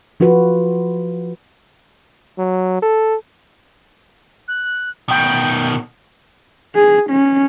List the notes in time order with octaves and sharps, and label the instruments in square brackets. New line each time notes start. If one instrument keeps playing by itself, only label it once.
[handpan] F3 F4 F#4 B4
[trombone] F#3
A4
[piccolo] F#6
[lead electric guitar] B2 D#3 [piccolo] G5
[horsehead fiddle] G#4
C#4